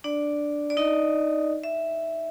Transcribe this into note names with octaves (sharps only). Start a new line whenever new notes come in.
D4 D5
D5
D#4 D#5
E5